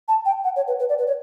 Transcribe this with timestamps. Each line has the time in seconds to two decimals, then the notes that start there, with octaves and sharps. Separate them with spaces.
0.08 A5
0.26 G5
0.44 F#5
0.56 C#5
0.68 B4
0.80 B4
0.89 D5
0.98 B4
1.07 C#5